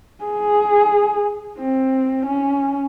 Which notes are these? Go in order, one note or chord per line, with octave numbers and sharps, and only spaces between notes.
G#4
C4
C#4